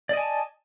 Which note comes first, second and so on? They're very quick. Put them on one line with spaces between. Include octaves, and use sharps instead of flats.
D5 D#5 G#5 A5